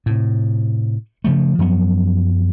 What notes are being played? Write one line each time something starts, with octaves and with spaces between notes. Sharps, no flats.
A2 C3
C#3 F3 A3
F#2 F3 F#3 B3